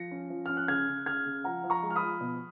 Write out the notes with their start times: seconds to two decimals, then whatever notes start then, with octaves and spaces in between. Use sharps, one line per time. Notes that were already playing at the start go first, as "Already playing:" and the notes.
Already playing: F3 A#6 C#7
0.11 C#4
0.30 F3
0.46 C#4 F6
0.57 F#6
0.68 C#3 F6 G#6
0.87 C#3
1.06 C#3 F6 G#6
1.25 C#3
1.44 F3 F#5 A#5
1.64 F3
1.70 A#5 C#6
1.83 G#3
1.90 F6
1.96 B5 D#6
2.02 F3
2.21 B2